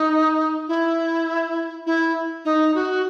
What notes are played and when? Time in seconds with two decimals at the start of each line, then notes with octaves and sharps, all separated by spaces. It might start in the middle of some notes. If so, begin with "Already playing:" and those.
Already playing: D#4
0.68 E4
1.86 E4
2.45 D#4
2.75 F#4